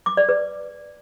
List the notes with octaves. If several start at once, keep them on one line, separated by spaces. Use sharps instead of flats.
D6
D5
B4